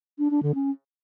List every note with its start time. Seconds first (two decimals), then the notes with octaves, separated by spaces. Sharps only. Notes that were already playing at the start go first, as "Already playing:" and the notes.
0.19 D4
0.31 D4
0.43 D3
0.55 C#4